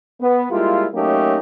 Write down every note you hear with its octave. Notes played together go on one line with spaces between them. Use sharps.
B3
G3 G#3 A#3 E4 F4
F#3 A3 A#3 C#4 D#4 G4